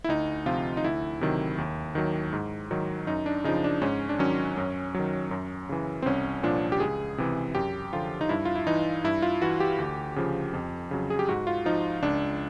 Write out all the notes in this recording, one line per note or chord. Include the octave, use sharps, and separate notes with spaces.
E4
D2 D#4
C3 F3 F4
D#4
D2 E4
C3 D#3 F#3
D#2
D#3 F#3
G#2
D#3 F#3
F#2 D#4
D4
C#3 F3 D#4
D4
G#2 C#4
D4
D#3 F#3 C#4
F#2
D#3 F#3
F#2
C#3 E3
C4
C2 C#4
A#2 F3 D4
G4
C#2 G#4
C3 E3
F#2 G4
D3 F3 F4
D#4
G2 E4
F4
E4
E3 D#4
G2 E4
F4
E3 F#4
G4
D2
C#3 F3
F2
C#3 F#3
G#4
G4
G#2 F#4
F4
F3 D#4
C#2 D4